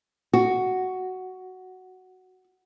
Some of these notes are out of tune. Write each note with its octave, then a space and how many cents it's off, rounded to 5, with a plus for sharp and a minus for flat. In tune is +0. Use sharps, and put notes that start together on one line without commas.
F#4 +5